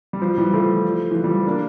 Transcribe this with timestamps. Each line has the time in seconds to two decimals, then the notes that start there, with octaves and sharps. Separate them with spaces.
0.13 G3
0.22 F3
0.38 E3 G3
0.53 F3 A3
1.11 E3
1.15 F3
1.24 G3
1.31 F3
1.46 A#3 D4